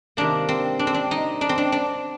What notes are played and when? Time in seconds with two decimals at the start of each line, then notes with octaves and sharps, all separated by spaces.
0.17 C3 D#3 A#3 D4
0.49 C4
0.79 D4
0.87 C4
0.94 D4
1.11 D#4
1.41 D4
1.49 C4
1.58 D4
1.72 D4